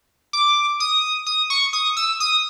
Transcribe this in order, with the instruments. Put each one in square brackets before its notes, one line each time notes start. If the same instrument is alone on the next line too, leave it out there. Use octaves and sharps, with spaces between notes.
[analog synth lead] D6
D#6
D#6
C#6
D#6
E6
D#6